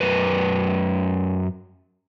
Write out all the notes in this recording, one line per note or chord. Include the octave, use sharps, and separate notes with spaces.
F#2 A#4 B4